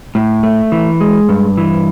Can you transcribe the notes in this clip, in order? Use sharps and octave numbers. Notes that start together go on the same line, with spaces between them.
A2
A3
E3
G#3
G2
E3